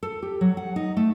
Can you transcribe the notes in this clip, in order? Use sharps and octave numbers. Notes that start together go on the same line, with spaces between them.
A4
G4
F#3
F#5
D#4
A3